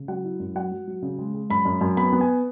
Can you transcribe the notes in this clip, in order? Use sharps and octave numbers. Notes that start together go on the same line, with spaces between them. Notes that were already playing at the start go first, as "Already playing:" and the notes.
Already playing: C#3
F#3 F#5
E4
F#2
F#3 F#5
F#3
F#3
C#3
G#3
G#3
F#2 B5
F#2
F#2
B3 B5
B3
G#5